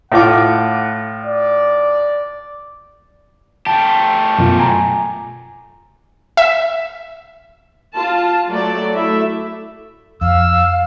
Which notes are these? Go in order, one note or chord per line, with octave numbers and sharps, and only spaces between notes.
A2 F4 F#5 D6
D5
A3 G4 A5
F#2 B2 F4
G#5 A#5
E5
F4 A5
F#3 A3 D5
A3 E4 E5
F2 F5 E6